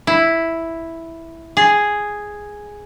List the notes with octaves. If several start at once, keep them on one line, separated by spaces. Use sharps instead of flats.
E4
G#4